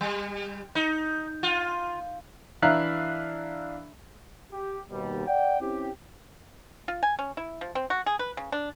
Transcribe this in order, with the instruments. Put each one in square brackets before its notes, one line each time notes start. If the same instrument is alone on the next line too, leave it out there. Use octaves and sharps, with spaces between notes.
[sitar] G3
D#4
F4
[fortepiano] E3 D4 E5 F5 A#5 F#6
[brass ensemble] G4
D#2 B2 G3
D5 F#5 G5
C4 C#4 E4 G4
[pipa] F4
G#5
C#4
E4
F3
C4
F#4
G#4
B4
C#3
D4